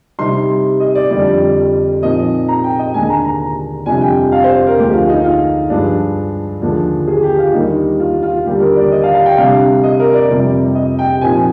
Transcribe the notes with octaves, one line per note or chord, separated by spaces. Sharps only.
C3 G3 C4 D#4 C6
D#5
D5
F2 D3 G3 D5
A#2 F3 C4 D#4 D#5
A#5
G5
D#5
D#2 D3 G#3 D4 G#5
A#5
A#5
F2 C3 G3 D4 G#5
G5
F5
C5
C5
A#4
D2 D3 F3 G#3 G4
F4
D#4
F4
G2 F3 G#3 D4
D#2 D3 F3 G#3 D4
G#4
G4
F4
D#2 D#3 G3 D4 D#4
F4
F4
D#2 D3 G3 G4
A#4
D5
D#5
F5
F5
G5
C3 G3 D4 F5
D#5
A#4
D5
F2 C3 G3
D#5
G5
A#2 F3 C4 D#4 G#5